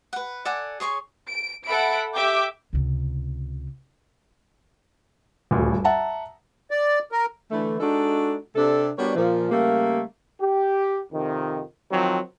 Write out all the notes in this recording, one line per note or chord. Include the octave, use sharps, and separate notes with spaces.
B4 F#5
A4 D5 F#5 G#5
G#4 C#5 C6 C#6
D7
A4 E5 F#5 B5 D7
G4 E5 G5 D6
C#2 C3
D#1 D2 G2
E5 F#5 A5 A#5
D5
A#4
D3 E3 A3
G#3 D4 D#4 F#4 A4
C3 D4 A4
G3 B3 D4 F#4 A#4 C#5
A#2 F3
C#3 G3 A3 A#3
G4
F2 C3 D#3
D#3 F3 F#3 C4